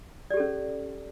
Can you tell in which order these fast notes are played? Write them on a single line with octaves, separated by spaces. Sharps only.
D5 G4 A4 C#4